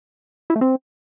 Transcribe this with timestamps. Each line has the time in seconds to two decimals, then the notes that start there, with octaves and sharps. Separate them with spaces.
0.50 E4
0.56 A3
0.61 C4